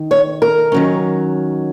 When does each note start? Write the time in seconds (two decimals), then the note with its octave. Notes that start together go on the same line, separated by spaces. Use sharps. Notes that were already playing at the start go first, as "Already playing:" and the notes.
Already playing: D#3
0.11 C#5
0.42 A#4
0.72 D#3 F#3 C#4